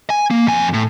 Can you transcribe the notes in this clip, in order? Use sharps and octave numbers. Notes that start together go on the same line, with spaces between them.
G#5
A#3
F2 G#5
A2